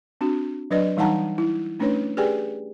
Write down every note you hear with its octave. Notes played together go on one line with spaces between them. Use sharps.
C4 D4 F#4
F#3 D4 B4 D5 D#5
E3 G3 D#4 F#5 A5 A#5
E4
A3 C#4 D4 B4 C#5
G4 G#4 B4 D5 G5 G#5